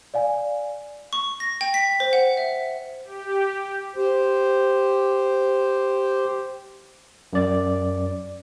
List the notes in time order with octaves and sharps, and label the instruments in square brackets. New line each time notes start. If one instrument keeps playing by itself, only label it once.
[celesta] D5 F5 G#5
[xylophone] C#6
A#6
G5
B6
C5
F#5
E5
[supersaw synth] G4
[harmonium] G4 C5
[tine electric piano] F#2 D5